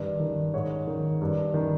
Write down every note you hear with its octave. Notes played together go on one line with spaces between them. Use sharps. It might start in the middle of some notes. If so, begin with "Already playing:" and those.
Already playing: G2 D#3
D#3
G#2 C#5
D#3
G2
D#3